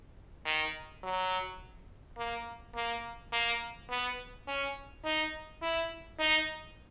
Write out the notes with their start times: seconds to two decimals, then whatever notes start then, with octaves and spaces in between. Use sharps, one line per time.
0.46 D#3
1.03 F#3
2.18 A#3
2.75 A#3
3.32 A#3
3.90 B3
4.47 C#4
5.05 D#4
5.62 E4
6.19 D#4